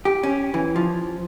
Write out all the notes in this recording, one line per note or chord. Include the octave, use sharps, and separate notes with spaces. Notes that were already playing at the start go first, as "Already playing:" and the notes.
G4
C#4
E3
F3